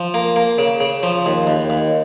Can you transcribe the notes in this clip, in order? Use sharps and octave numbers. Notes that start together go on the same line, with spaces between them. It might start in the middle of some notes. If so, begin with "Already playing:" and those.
Already playing: F3
A#3
A#3
C#3
C#3
F3
D#2
D#2
D#2